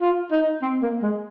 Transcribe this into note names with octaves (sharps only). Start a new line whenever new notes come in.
F4
D#4
C4
A#3
G#3